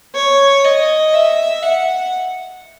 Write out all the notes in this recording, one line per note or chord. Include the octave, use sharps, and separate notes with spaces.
C#5
D#5
E5
F#5